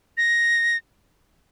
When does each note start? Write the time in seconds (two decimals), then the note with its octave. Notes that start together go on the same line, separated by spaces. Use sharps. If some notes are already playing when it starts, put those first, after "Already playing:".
0.17 A#6